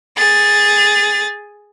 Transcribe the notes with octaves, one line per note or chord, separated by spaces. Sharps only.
G#4 A6